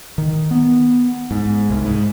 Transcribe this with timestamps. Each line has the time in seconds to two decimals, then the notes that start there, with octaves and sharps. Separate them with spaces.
0.18 D#3
0.51 B3
1.31 G#2
1.70 C2
1.85 G#2